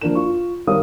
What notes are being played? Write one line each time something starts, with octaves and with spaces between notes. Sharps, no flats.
F3 A#3 D4 A#4 E7
F4 C#6
D#3 G3 A#4 C#5 F5 D#6